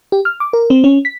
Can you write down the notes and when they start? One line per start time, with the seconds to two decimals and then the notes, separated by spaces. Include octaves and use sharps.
0.12 G4
0.25 F6
0.40 D6
0.53 A#4
0.70 C4
0.84 C#4
1.05 B6